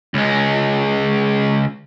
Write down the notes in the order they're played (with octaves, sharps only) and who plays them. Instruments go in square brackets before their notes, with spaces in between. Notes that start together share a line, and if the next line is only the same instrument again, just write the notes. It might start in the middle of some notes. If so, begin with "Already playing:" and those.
[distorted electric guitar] C#2 G#3